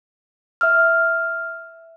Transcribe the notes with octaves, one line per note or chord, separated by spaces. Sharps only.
E5 E6 F6